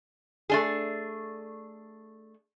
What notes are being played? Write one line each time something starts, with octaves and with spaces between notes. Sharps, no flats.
A3 D4 G#4